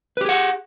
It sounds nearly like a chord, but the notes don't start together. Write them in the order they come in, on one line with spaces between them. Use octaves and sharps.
B4 G4 G#4 F#5